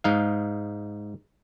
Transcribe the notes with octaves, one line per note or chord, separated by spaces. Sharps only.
G#2 D#4 F5